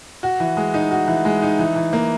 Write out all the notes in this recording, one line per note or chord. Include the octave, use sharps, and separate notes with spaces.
F#4
E3
G#3
D#4
F#4
E3
G#3
D#4
E3
E3
A#3